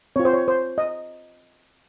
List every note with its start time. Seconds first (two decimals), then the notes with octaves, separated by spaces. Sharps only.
0.16 C4 F4 C#5
0.25 C5
0.33 C#5
0.48 C5
0.78 D#5